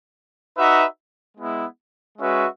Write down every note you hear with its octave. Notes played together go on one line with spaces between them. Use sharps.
D#4 F#4 B4 E5
G#3 B3 E4
G#3 C#4 F#4 B4 E5